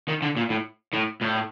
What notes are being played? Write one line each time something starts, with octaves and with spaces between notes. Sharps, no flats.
D#3
D3
A#2
A2
A2
A2